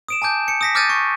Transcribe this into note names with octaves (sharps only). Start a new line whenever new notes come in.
D#6 D7 E7
G#5 A5 D6 G6
C#7
D#6 A#6 B6
D6 F6 G6 A6 D#7
C#6